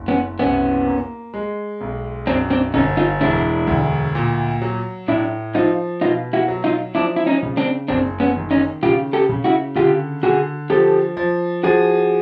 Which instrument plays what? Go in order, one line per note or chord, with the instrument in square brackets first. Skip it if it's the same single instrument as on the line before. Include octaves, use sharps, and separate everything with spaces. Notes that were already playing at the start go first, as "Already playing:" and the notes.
Already playing: [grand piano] F#1
[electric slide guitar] B3 C#4
[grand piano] C2 [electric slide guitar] B3 C#4
[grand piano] A#3
G#3
B1
[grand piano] F#2 [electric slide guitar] C4 D4
[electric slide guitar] C4 D4
[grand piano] G1 [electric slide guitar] C#4 D#4
[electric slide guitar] D#4 F4
[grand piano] E1 [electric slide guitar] D4 E4
[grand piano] D2
A#2
F#3
[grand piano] A2 [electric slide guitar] D4 E4
[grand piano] F3 [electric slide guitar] D#4 F4
[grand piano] B2 [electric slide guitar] D#4 F4
[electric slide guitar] E4 F#4
[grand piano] F#3
[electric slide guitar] D#4 F4
[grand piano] F3 [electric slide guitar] D4 E4
[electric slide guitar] E4
C#4 D#4
[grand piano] C#3
[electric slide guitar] C4 D4
[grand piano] F#1 [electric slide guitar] C4 D4
[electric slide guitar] B3 C#4
[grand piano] D#3
[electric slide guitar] C#4 D#4
[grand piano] C#3 [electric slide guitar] F4 G4
[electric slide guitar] G4 A4
[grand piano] C#3
[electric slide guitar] E4 F#4
[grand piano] D3 [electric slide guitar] F4 G4
[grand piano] D3 [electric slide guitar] F#4 G#4
[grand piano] F3 [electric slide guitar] G4 A4
[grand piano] F3
[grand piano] F3 [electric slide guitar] F#4 G#4